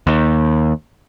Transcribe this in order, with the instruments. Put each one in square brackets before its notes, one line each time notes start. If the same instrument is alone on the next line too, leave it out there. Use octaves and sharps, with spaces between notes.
[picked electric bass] D#2